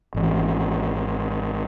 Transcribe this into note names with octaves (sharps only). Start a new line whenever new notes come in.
G#1 E3